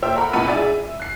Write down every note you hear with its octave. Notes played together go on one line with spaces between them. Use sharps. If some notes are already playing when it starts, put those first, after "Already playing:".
A#2 C5 E5 G5 E6
A4 A#4 F#5 B5
C#2 B2 E4 F#5 B5 D#7
G#3 D4 G#4 D5 E5
E5
F#6 C7